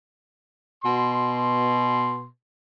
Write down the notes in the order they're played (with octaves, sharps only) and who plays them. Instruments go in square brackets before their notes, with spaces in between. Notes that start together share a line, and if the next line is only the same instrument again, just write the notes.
[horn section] B2 C6